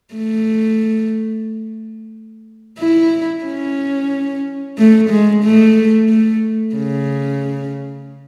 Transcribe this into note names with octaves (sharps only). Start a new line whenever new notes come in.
A3
E4
C#4
A3
G#3
A3
A3
C#3